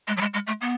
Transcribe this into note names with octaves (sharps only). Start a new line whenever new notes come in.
G#3
F#3
G#3
G#3
A3
B3